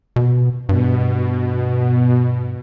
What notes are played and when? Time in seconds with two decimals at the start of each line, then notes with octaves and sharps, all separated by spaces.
0.16 B2
0.69 G2 B2